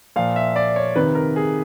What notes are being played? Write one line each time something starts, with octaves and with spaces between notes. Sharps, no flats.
A#2 F3 F5
E5
D5
C#5
C3 D#3 B4
A#4
G#4